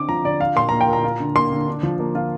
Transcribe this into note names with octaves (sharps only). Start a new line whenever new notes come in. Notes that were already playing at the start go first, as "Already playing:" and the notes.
Already playing: D3 C4 D6
F3 A#5
D3 D5
F4 F5
A#2 C6
A#3 A#5
G5
A#2 A#5
F4
D3
A#3 C6
D3
D4
F3
A#3
F4